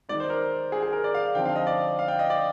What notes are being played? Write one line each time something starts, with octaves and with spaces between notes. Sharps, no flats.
D#3 G#3 D#4 D5
C5
A#4
G#4
G#4
A#4
D5
F5
D3 F3 C4 D#4 G5
F5
D#5
D5
F5
G5
D#5
D5